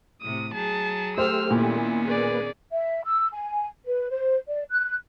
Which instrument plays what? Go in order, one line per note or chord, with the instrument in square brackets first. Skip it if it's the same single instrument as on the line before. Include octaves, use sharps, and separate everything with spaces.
[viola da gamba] A2 C3 [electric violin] D#6
[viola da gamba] F#3 G#4 [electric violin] A5
[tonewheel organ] A3 G4 [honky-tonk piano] C5 [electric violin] E6 F6
[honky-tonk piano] A#2 [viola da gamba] D#3 B3 C#4 [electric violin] E4
[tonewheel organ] A#3 B4 [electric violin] G#4 D5
[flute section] E5
E6
G#5
B4
C5
D5
F#6